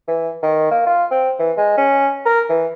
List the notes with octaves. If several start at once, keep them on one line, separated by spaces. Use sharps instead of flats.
E3
D#3
A#3
F4
C4
E3
G#3
C#4
A#4
E3